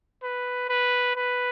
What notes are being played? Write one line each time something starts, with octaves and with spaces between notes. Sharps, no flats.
B4
B4
B4